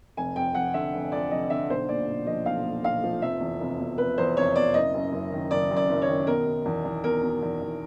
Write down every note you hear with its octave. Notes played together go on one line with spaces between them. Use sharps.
F1 G#5
F2 G5
F1 F#5
D3 E5
F1
F2 D5
F1 D#5
D3 E5
B1 C5
A#2 D5
B1
F3 D#5
B1 F5
A#2
B1 F5
F3
F1 E5
E2
F1
B2
F1 B4
E2 C5
F1 C#5
B2 D5
F#1 D#5
F#2
F#1
D#3
F#1 D5
F#2
D5
F#1
C#5
D#3
B2 A#4
B2
E2
E2
B2 A#4
B2
E2
E2